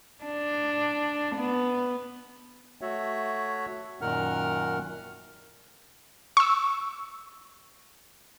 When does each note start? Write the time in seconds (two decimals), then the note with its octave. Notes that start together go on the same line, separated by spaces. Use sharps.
0.24 D4
1.35 B3
2.81 A3 F#4 C#5 E5
4.01 F#2 A#2 D#3 A#4 F#5 F6
6.37 C#6 E6